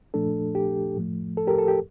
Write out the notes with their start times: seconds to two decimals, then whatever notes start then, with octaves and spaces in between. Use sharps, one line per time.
0.14 A#2 F3 A3 D4 A4
0.55 G4
0.97 A2 F3 A3
1.37 A4
1.47 G4 A#4
1.59 A4
1.68 G4